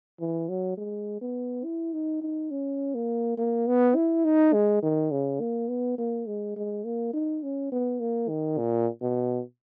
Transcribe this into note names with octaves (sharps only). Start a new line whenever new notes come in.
E3
F#3
G#3
B3
E4
D#4
D#4
C#4
A#3
A#3
B3
E4
D#4
G#3
D#3
C#3
A#3
B3
A#3
G#3
G#3
A#3
D#4
C#4
B3
A#3
D#3
A#2
B2